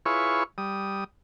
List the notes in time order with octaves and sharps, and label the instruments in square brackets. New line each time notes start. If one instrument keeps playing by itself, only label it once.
[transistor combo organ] E4 F4 G#4 B4 C#5 C#6
G3 D#6